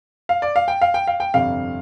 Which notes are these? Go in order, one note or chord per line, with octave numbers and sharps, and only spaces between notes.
F5
D5
F5
G5
F5
G5
F5
G5
G1 F2 C3 G3 F5